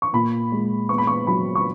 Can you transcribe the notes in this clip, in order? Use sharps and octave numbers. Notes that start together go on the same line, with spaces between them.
C#6
A#2 B5
G#3
B3 C#6
B5
C#6
F#3 B5
C#6